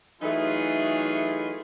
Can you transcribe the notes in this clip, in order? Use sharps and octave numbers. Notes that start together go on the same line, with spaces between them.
E3 F#3 A3 D#4 F4 G#4